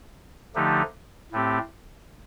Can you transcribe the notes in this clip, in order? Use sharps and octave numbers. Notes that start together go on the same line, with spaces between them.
D3 F3 A3 D#4 G4
A2 A3 C4 G4